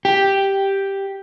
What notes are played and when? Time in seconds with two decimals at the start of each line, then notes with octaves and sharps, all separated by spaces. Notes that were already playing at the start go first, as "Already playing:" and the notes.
0.05 G4